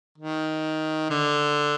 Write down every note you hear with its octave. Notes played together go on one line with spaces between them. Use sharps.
D#3
D3